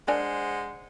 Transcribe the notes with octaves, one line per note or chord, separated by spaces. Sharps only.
G#3 D4 A#4 C5 F#5 G#5